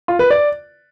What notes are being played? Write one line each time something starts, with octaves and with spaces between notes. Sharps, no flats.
F4
B4
D5